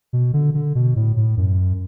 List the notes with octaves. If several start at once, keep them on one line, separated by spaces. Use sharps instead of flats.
B2
D3
D3
B2
A2
A2
F#2